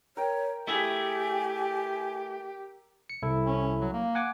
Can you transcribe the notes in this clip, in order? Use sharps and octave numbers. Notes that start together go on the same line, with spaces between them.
A#4 C#5 G5
A3 E4 G4 G#4 G#5 E6
C#7
C2 E4 A4
C#4
F#3
A#3
F#5 G#5 D6